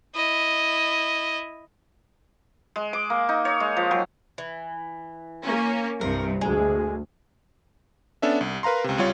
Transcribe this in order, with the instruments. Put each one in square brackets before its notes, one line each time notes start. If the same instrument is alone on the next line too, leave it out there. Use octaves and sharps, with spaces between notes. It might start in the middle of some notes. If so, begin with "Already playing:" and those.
[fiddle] E4 D#5
[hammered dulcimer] G#3
D6
A#3
D#4
C#5
G#3
F3
F#3
[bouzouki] E3
[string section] A#3 C#4
[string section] C2 G2 C3 [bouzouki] A#4
[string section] D2 [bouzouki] G#3
[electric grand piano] B3 C#4 D4 A4 E5
C2
A#4 B4 F5 A#5 C6
C#2 C3
C2 G3 F4 C#5